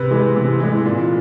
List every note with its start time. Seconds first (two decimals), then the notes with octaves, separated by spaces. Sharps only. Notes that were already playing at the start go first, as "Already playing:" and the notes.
Already playing: C3 B4
0.11 E3 G#3
0.36 C3
0.60 E3 G#3
0.85 A#2